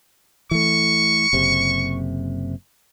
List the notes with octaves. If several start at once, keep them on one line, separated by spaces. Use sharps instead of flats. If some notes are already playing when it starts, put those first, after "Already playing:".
E3 A3 C#6
F#1 C3